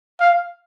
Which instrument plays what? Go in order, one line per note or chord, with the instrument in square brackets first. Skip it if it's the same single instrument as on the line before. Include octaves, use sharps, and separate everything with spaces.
[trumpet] F5